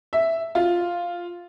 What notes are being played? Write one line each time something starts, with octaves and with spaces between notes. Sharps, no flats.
E5
F4